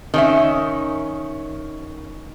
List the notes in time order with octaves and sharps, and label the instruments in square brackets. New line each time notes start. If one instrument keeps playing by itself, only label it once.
[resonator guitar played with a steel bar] D#3 C#4 E5